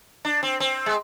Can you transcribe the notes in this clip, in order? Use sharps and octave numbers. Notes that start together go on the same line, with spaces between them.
D4
C4
C4
G#3